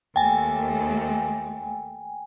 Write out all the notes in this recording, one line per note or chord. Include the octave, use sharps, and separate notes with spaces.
D#2 A3 G5 G#5